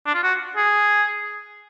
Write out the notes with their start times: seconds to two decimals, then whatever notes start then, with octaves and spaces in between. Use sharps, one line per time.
0.06 D4
0.14 F4
0.23 F#4
0.57 G#4